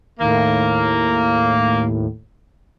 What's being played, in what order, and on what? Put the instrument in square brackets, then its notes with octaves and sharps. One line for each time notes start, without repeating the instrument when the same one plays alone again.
[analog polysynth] D#2 A2 [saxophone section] A#3